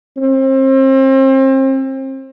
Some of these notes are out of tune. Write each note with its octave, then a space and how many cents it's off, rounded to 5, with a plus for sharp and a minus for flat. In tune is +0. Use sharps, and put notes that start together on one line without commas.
C4 +35